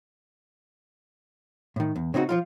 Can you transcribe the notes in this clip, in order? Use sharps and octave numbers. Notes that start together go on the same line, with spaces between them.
A2 D#3
E2
C#3 C4 D#4 E4 F#4
F3 F#3 F4